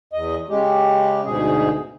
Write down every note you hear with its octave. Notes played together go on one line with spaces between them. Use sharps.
E2 D#5
C#3 G#3 G4
D2 G#2 B2 G#4